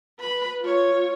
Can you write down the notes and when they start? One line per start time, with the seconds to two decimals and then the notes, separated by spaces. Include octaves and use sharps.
0.20 B4 B5
0.61 F4 C#5